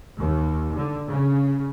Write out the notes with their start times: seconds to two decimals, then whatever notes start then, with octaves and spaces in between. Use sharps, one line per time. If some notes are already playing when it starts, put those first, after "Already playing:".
0.18 D#2
0.77 D3
1.09 C#3